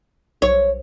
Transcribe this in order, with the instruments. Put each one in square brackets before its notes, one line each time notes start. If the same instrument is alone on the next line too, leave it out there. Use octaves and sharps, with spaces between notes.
[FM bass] B1 [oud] C#5